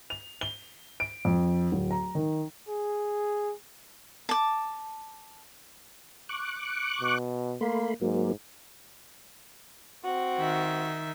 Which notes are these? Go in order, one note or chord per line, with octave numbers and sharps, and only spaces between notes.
F7
G7
D7
F2
D1
A#5
D#3
G#4
A5 D6
C#6 D6 F#6
B2
A3 A#3 B5 C6
G#2 F#3 A#3
C4 F#4
D#3 E5